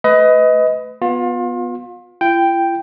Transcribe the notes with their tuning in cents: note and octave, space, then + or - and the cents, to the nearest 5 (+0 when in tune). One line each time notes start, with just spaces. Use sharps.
A3 +0 B4 +25 D#5 +20
B3 +0 F4 +30
E4 +45 G5 +0